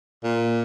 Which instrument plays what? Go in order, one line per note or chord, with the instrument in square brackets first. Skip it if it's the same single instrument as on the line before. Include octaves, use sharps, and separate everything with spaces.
[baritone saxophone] A#2